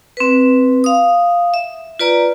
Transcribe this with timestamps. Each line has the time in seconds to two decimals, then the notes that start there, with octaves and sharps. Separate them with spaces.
0.17 C4 B4
0.84 F5 D#6
1.54 E5
1.99 F4 B4 D5 A#5